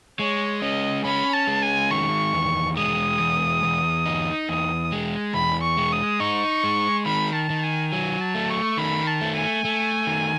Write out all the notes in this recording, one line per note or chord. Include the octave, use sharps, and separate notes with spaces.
G#3 C#5
C#4 D#5
C#4 B5
A5
G#3
G#5
D#3 C#6
E2
G#3 D#6
E2
E2
D#4
E2 D#6
G#3
E2 B5
C#6
G#3
D#6
D#4 C#6
G#3
D#3 B5
A5
D#3
G#5
F#3 G#5
A5
A3
C#6
D#3 B5
A5
A3
G#5
A3
D#3